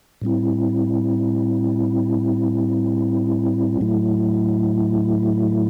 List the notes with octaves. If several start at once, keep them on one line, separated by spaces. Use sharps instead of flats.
A2 G3 C4 E4
A2 F#3 A3 E4